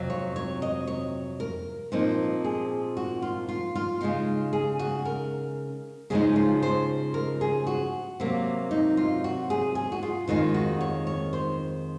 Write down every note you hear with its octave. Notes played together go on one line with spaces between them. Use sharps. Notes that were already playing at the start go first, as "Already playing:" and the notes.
Already playing: F2 C3 F#3
C#5
C#5
D#5
C#5
A#4
A#2 F3 C4 D#4
G#4
F#4
F4
F4
F4
C#3 G#3 D#4 F4
G#4
F#4
A#4
C#3 F3 G#3 D#4 G#4
F4
C5
A#4
G#4
F#4
C3 F#3 A#3
D#4
F4
F#4
G#4
G#4
F#4
F4
F2 D#3 G#3 D#4 F4
F#4
C#5
C#5
C5